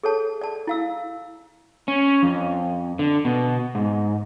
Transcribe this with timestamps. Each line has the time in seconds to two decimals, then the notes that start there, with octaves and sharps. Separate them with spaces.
0.03 G#4 A4 C#5 A5
0.41 D5 A5
0.67 E4 F5 E6
1.88 C#4
2.23 F2
2.99 D3
3.25 B2
3.75 G#2